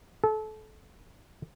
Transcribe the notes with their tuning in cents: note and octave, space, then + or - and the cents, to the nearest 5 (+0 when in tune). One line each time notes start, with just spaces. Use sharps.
A4 -30